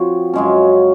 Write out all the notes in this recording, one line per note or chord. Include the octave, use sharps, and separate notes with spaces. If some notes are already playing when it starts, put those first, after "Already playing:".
Already playing: F3 C4 F#4 C#5
F#2 C#3 G#3 C#4